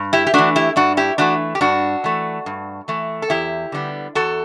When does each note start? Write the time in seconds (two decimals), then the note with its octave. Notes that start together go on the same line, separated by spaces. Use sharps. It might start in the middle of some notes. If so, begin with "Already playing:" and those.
Already playing: G2
0.13 E4 G4
0.27 G4
0.34 E3 A3 D4 F#4
0.56 E4 G4
0.76 G2 D4 F#4
0.97 E4 G4
1.18 E3 A3 D4 F#4
1.55 G4
1.61 G2 D4 F#4
2.04 E3 A3
2.46 G2
2.88 E3 A3
3.22 A4
3.30 E2 E4 G4
3.72 D3 G3 B3
4.15 E2 F#4 A4